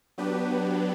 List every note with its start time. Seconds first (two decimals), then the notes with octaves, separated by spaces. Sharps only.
0.18 F#3 B3 D4 G4 B4